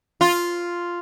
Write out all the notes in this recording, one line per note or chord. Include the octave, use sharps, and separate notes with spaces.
F4